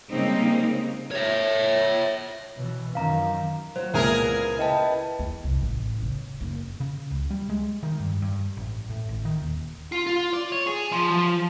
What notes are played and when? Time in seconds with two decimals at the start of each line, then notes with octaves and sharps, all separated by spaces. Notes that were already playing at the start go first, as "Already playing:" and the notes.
0.11 C#3 G3 G#3 A#3 C4 D#4
1.12 C#5 E5
2.56 B2 E3
2.95 F#2 D#3 F5 A#5
3.76 F#3 F#4 C5
3.94 C#2 A#2 B3 E4 G#4 A#4 F5
4.59 E4 B4 D#5 G5 A5
5.19 E2
5.44 C2
5.62 A1
6.02 C#3
6.41 F#1
6.80 C#3
7.11 C#2
7.31 G3
7.50 G#3
7.83 D#3
8.00 G2
8.22 G2
8.57 A1
8.89 A2
9.09 G#1
9.25 D#3
9.42 D#1
9.92 F4
10.07 F4
10.34 D5
10.52 C#5
10.67 G#4
10.92 F3
11.11 F3